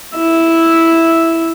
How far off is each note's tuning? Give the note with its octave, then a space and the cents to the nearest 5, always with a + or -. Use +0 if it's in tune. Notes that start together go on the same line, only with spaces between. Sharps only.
E4 +0 E5 -5